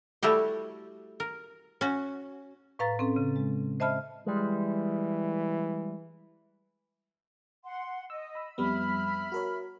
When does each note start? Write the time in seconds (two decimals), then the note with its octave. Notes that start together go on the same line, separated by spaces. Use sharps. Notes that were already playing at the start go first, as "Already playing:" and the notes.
0.23 G3 A3 E4 F#4 G4
1.20 A#4
1.81 C#4 F#4
2.79 A2 B4 F5 A#5 A6
2.99 C4 C#4 A4
3.16 C#3
3.36 G#3
3.80 C5 D#5 E5 A5 B5 F6
4.26 E3 G3 G#3
7.64 F#5 C6
8.10 D#5 E6
8.35 B5 E6
8.58 F2 G3 B3 E5 B5 F6
9.32 F#4 A#4 C#5